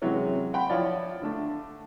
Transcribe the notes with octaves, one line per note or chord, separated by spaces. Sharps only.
C3 E3 F#3 G#3 C#4
F#5 G5 B5 C6
F3 E4 F4 C#5 D5
D3 A3 D4